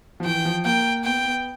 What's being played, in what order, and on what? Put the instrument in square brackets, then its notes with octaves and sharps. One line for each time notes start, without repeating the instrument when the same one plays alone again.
[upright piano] F3
[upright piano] E3 [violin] G5
[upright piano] F3
[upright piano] A#3 [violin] G5
[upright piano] B3 [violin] G5
[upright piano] B3